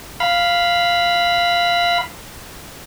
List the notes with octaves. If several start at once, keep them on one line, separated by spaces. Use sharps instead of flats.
F5 B5